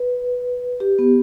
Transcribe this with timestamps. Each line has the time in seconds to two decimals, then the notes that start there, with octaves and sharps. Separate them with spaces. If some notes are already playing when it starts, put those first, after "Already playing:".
Already playing: B4
0.80 G4
0.99 B3